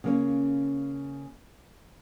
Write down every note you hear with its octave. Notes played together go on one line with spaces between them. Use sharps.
C#3 A#3 C#4